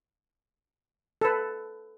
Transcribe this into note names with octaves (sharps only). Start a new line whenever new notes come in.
A4 B4